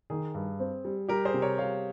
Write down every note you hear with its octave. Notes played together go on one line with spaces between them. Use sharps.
D#3 G#4
G2
C4
G3
G3 G4 A#4
G#4 C5
C3
A#4 C#5
G3 C#5 F5